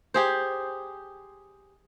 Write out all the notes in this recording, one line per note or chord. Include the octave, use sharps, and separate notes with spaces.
G4 G#4 C5